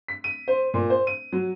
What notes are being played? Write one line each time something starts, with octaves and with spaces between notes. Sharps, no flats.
B6
D#7
C5
A#2
C5
D#7
F#3